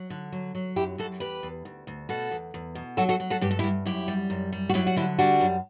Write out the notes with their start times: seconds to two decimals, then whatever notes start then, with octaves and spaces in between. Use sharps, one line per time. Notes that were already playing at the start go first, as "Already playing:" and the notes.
Already playing: F#3
0.10 D3
0.32 F#3
0.55 F#3
0.76 F#2 E4 G4
0.98 F#2 F#4 A4
1.20 E2 G4 B4
1.43 E2
1.65 D2
1.87 D2
2.09 B2 F#4 A4
2.31 E2
2.54 E2
2.75 B2
2.97 F#3 F#4 A4
3.09 F#4 A4
3.20 F#3
3.30 F#4 A4
3.41 G2 G4
3.51 A4
3.59 E4 G4
3.64 G2
3.86 F#2 E4 G4
4.08 G3
4.30 F#2
4.52 G3
4.69 F#4
4.74 F#3 E4 G4
4.87 F#4
4.96 D3 C4 E4
5.18 G3 D4 F#4
5.41 F#2